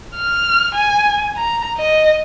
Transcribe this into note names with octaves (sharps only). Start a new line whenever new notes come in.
F6
G#5
A#5
D#5